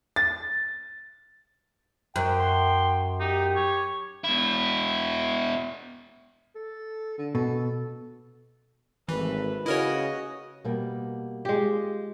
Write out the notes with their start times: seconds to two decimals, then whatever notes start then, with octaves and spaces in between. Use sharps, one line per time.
0.16 A6
2.16 F#2 G5
2.40 C6
3.20 D#4 G4
3.55 C#5
4.24 B2 E4
6.55 A4
7.18 D3
7.35 B2 A4
9.09 G#1 E3 A3 B4
9.66 C#3 E4 F#4 A#4 C#5 D#5
10.65 B2 G3 A#3
11.45 G#3 F4 G4